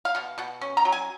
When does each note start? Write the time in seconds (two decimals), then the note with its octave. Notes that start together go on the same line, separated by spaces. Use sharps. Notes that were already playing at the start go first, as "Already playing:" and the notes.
0.05 F5
0.15 B2 F#5
0.38 B2 F#5
0.61 C#4
0.77 A#5
0.85 F#3
0.92 G#5